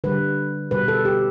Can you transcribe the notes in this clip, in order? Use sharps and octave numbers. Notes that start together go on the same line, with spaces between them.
D3 G3 B4
B2 G3 B4
A4
G4